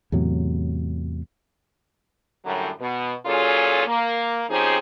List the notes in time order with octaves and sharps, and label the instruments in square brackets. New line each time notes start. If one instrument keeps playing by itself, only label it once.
[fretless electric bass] E2 A2 C3 F#3
[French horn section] F#2 A2 D3 F#3 G3
B2
A#2 F#3 C#4 F4 G#4 A4
A#3
F3 C4 C#4 D#4 G4 G#4